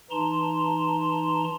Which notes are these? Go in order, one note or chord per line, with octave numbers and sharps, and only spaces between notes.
E3 D#4 A5 A#5 C6